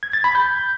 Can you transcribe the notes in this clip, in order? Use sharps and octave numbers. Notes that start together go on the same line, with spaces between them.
G#6
A6
B5
G6